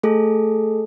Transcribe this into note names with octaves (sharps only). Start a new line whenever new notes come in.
A3 G#4 A4